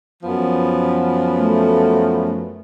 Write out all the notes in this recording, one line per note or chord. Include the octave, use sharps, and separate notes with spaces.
F#2 F3 B3
A3